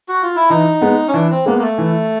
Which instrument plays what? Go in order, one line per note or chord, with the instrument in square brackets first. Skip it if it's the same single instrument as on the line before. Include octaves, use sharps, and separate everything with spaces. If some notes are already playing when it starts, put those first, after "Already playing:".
[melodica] F#4
F4
E4
[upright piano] E3 [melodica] D#4
[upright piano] G#3 B3
[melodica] C#4
[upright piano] E3 [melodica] D4
[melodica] C4
[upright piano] G#3 B3 [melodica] A#3
[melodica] A#3
A3
[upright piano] E3